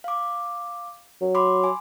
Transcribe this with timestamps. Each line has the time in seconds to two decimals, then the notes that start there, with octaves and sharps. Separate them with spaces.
0.04 F5 D6
1.21 F#3
1.35 B5 C6 D6
1.64 G#5